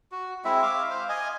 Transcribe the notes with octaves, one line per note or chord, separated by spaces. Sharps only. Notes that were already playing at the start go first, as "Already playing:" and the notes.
F#4
G#3 C4 E4 E5
E5 F5 D6
C5 F5
D#5 G#5